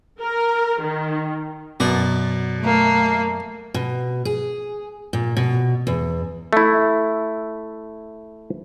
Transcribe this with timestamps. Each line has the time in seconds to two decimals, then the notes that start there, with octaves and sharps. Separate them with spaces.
0.20 A#4
0.81 D#3
1.80 F#2 B2 A#4 D5
2.61 A3 A#3
3.74 B2
4.25 G#4
5.13 A#2
5.37 B2
5.87 E2
6.53 A3 E4